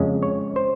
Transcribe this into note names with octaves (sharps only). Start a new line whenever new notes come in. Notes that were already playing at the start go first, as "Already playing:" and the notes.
Already playing: F2 C#3 G#3 C#4
C#5
C5